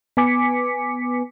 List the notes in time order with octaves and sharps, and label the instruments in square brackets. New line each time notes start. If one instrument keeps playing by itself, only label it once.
[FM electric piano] B3 B4 G#5 D6 B6 C#7